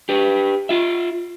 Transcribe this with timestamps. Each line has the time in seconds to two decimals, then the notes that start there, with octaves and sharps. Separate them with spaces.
0.09 G4 B4
0.69 F4 E5